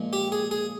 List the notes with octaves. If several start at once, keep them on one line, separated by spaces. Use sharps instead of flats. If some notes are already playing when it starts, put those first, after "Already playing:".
Already playing: A#2 F3 G#3
G4
G#4
G#4